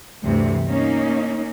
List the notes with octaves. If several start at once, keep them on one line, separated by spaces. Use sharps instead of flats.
D2 G2 C3 E3
A#3 C#4 D#4